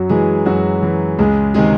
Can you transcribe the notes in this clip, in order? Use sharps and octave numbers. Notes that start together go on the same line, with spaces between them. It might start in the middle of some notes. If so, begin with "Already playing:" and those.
Already playing: F#2 F#3 F#4
E3 G#3 G#4
F#2 F#3 F#4
E3
C#2 G#3 G#4
C3 D#3 G#3 G#4